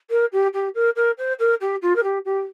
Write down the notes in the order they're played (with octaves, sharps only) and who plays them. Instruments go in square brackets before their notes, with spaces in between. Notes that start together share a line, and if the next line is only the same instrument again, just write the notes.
[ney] A#4
G4
G4
A#4
A#4
C5
A#4
G4
F4
A#4
G4
G4